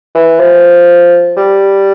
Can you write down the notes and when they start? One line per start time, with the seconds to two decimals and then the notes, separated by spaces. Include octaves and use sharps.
0.15 E3
0.40 F3
1.37 G3